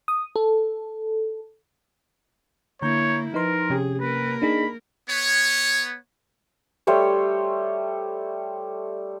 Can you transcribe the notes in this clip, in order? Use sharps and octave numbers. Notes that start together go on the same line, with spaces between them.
D#6
A4
D3 A#3 E4 C#5 A#5 G6
F3 D#4 A#4 B4 C6
C3 C#4 G4 G#4
A#3 A#4 B4
D4 D#4 G#4 B5
B3 C#5
G3 A3 C5 C#5